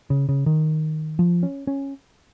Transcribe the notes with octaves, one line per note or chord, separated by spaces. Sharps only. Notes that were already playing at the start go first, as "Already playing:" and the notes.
C#3
C#3
D#3
F3
C#4
C#4